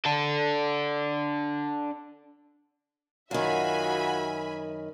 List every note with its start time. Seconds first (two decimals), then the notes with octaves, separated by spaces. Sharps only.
0.05 D4 A4
3.31 F#2 D#3 F4 F#4 E5 G#5 B5